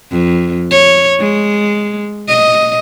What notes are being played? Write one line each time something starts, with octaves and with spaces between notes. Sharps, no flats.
F2
C#5
G#3
D#5